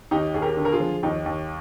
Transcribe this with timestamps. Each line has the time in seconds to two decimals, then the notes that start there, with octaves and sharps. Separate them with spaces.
0.11 D#2 D#4 G4
0.34 D#2 G#4
0.42 G4 A#4
0.57 D3
0.65 A#4
0.72 F4 G#4
0.80 F3
1.03 D#2 D#4 G4
1.26 D#2